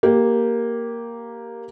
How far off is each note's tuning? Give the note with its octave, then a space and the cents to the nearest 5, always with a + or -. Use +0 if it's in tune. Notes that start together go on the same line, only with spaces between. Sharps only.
A#3 +0 G4 +0